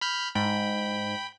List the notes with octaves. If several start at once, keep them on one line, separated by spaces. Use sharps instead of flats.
B5 F6 G6
G#2 G5 B5